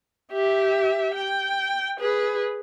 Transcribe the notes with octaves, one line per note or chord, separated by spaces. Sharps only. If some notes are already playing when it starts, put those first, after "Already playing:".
G4 E5
G5
G#4 B4